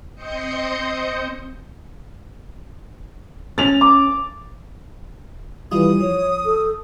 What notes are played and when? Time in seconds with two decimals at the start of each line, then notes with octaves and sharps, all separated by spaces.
0.15 C4 C5 D#5 D#6 G6 C#7
3.58 C#4 A6 F7
3.81 D6
5.71 E3 G3 E4 F4 D#6
6.01 F3 C#5
6.45 A4